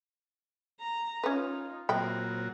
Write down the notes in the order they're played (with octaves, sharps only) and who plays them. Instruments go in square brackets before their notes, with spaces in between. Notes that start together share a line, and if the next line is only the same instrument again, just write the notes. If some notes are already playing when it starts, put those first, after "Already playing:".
[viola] A#5
[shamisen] C#4 B4 [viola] D#4 F4
[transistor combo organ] A#2 F#3 [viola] C4 [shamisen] G5 B5